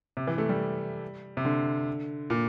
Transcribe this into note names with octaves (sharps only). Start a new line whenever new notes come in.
C3
E3
A3
G3
C3
D3
A#2